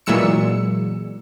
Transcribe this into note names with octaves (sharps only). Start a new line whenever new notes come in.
A#2 E3 F#3 G#3 E6 C#7